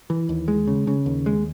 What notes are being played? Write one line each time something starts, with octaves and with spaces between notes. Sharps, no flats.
E3
D#2
G#3
C#3
C#3
D#2
G#3